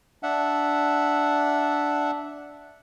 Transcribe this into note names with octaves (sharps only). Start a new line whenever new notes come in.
D4 E5 F#5